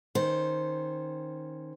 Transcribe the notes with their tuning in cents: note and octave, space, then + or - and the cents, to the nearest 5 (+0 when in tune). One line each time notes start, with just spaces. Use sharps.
D#3 +0 C#4 -20 C5 +0